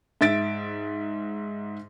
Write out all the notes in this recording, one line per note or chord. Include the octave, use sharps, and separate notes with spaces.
G#2 E5 A6 D7